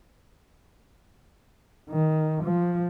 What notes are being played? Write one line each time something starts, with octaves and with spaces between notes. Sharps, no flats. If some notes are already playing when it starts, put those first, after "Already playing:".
D#3
F3